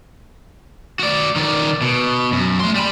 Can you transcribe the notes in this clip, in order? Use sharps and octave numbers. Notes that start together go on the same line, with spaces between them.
F#4 D5
D#3 D5
B2
F#2
A3 C6
G3 B5